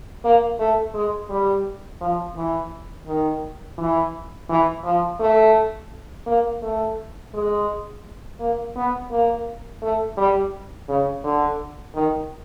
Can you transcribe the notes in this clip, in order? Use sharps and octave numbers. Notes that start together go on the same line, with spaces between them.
A#3
A3
G#3
G3
F3
E3
D#3
E3
E3
F3
A3
A#3
A3
G#3
A#3
B3
A#3
A3
G3
C#3
D3
D#3